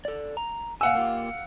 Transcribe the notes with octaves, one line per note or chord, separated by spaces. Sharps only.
A4 D5
A#5
A#2 F5 F#5 G#5 E6
A#3 F4 G4